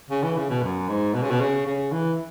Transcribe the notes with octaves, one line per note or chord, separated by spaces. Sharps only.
C#3
E3
C#3
B2
F#2
G#2
B2
C#3
B2
C#3
C#3
E3